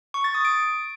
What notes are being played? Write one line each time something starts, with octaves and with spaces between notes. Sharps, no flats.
C#6
A6
D#6
D7